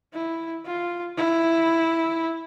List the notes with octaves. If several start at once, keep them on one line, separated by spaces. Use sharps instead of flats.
E4
F4
E4